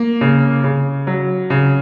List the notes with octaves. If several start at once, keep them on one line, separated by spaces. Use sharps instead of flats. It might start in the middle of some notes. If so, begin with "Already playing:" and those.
Already playing: A#3
C#3
C#3
F#3
C#3